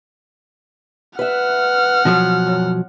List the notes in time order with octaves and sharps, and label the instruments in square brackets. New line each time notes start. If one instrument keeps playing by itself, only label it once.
[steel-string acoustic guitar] B4 E5 [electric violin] F#5 F6
[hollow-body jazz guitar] B2 F3 F#3
[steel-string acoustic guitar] F#2